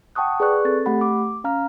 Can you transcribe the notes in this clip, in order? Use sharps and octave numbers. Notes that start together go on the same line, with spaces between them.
F#5 G5 A5 C#6 D#6 F#6
G#4 B4 D5 C#6 F#6
C4 A4 A6
A3 G4 F#5 B5
D6
C#4 F5 A#5 F6